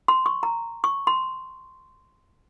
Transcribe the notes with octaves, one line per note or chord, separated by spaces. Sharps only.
C6
C#6
A#5
C#6
C6